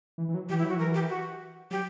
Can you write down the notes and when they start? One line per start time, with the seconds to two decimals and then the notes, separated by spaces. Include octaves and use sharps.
0.18 E3
0.29 E3
0.34 F#3
0.49 E3 G4
0.59 E4
0.63 F#3
0.69 F#4
0.76 E3 A#4
0.94 G4
1.10 F#4
1.71 F#3 G4